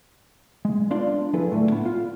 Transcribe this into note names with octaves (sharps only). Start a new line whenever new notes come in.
G#3
B3 D4 F4 D5 F5 C6
F3 F#3 E4 G#4 A4 B4
A2 D3 A3
B3
F4